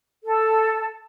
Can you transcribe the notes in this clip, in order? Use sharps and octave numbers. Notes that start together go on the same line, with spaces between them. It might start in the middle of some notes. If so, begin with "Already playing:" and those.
A4